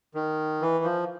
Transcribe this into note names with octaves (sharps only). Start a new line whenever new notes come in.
D#3
E3
F3